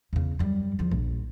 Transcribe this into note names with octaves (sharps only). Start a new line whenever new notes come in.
E2 C#3
F#2 G3
E2 F3
A#1